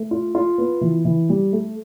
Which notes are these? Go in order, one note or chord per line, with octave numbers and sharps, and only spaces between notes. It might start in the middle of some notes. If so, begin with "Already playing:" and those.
Already playing: A3
F4
F4
B3
E3
E3
G3
A3